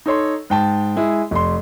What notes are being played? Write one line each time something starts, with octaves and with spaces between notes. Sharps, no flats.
D#4 A4 C#5 C6
G#2 G5 A5
G#3 E4 G#4
F1 C6